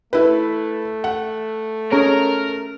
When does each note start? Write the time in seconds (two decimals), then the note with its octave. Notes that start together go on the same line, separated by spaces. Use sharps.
0.13 A3 E4 B4
1.04 F#5
1.92 C#4 G#4 A#4 C#5